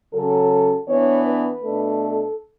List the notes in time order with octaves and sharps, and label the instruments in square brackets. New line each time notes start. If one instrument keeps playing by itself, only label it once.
[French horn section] C#3 F#3 C#4 A4
E3 B3 D4 C#5
B4
B2 A3 D4
A4